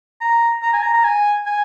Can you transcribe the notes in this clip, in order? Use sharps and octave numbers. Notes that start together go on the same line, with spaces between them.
A#5
A#5
G#5
A#5
A#5
G#5
G#5